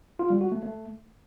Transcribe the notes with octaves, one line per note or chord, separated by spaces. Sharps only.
F4
G3
F#4
A3
A3